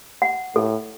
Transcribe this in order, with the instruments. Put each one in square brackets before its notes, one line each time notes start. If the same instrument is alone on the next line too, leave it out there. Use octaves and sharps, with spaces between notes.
[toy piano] F#5
[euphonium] A2 [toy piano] A4